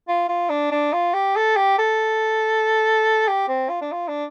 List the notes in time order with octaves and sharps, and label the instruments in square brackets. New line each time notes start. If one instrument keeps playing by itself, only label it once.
[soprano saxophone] F4
F4
D4
D4
F4
G4
A4
G4
A4
G4
C4
F4
D4
F4
D4